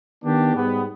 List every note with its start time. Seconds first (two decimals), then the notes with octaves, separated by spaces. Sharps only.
0.23 D#3 B3 D4 G4
0.53 G#2 G3 B3